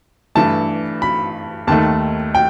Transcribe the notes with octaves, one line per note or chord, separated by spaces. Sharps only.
G2 E3 A3 A5
B5
D#2 D#3 A3 A5
G5